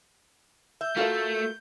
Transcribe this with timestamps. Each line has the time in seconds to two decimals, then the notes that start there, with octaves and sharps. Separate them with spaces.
0.81 E5 G6
0.97 A3 F4 F#4 A4 A#4 E5